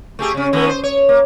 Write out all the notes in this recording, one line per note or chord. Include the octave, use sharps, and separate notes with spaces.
A3 G4 G#4
C#3 C#4
D#3 A3 B3
C5
C#5
A#3